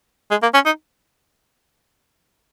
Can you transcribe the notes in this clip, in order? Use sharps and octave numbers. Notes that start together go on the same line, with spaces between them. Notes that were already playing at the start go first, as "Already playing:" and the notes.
G#3
A#3
C#4
D#4